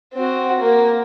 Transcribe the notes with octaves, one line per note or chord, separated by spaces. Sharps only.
C4 F#4
A#3